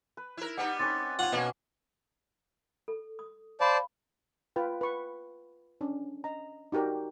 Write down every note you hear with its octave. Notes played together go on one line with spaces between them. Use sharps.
B4
E4 A#4
G3 B3 D#4 F#5
C4 C#4 B4 D6 A6
F4 C#5 F#5
B2 A#3 C#4 D4 B4
A4
D#6
C5 D5 F5 A5 B5 C#6
F4 B4 G5
B4 C#6
C#4 D4
D#5 A#5
D#4 F#4 G4 A#4 D5